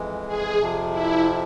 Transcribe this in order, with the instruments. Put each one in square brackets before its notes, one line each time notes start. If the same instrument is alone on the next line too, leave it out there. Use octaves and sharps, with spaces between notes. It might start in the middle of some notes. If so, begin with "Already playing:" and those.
Already playing: [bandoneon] F2 E3 G#3
[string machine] G#4
[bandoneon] F2 C3 F3
[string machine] E4